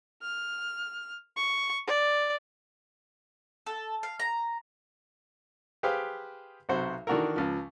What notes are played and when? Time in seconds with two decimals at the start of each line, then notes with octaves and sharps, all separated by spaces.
0.22 F6
1.36 C#6
1.87 D5
3.66 A4
4.03 F5
4.20 A#5
5.83 G4 G#4 B4 C5 F5 G5
6.69 B1 C3 F#4 C5
7.07 D#3 E3 D4 F#4 A4 A#4
7.36 C#2 F3